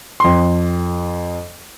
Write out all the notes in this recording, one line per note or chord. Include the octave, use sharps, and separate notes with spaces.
F2 C6